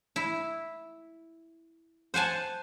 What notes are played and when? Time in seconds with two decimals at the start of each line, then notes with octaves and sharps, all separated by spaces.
0.16 E4
2.14 C5 F#5 G#5 A5